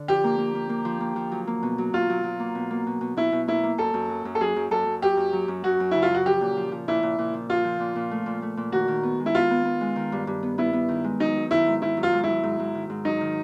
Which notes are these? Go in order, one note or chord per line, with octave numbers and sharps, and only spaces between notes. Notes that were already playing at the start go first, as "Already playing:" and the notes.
Already playing: D3
F3 G4
A#3
A#3
A#3
A#3
F3
A#3
F3
F#3
A#3
B2
F#3
B2 F4
F#3
F#3
A#3
B2
A#3
B2
B2
B2 E4
B2
A#3 E4
A#3
F#2 A4
F#2
F#3
F#2
A4
F#2 G#4
F#2
F#2 A4
F#2
F#3 G4
F#2
F#3
F#2
F#3 F#4
F#2
C#3 E4
F4
F#3 F#4
F3 G4
A#2
F3
F3
A#2 E4
A#2
A#2
F3
F3 F4
F3
A#2
A#2
A3
A#2
A3
A#2
D#3 F#4
D#3
B3
G#3
E4
B3 F4
B3
B3
G#3
D#3
G2
G2
B3
B3 E4
B3
D#3
G#3
F#3 D#4
F#3
D#3 E4
G#2
D#3 E4
F#3
F4
G#2
F#3 E4
G#2
G#2
D#3
G#2
F#3 D#4
D#3